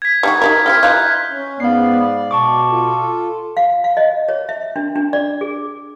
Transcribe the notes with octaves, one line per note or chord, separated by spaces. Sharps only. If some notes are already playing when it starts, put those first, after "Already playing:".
G#6 B6
G3 D#4 F#4
D#4 G4 A#4
C4 E4 G4 F6 G#6 B6
E3 D#4 F4 F#6 G6
C#4
G#2 B3 D5 F5 C7
B2 A5 C#6 D6
F4 A4
F5
F5
D#5
C#5
E5
D4
D4
D5
G#4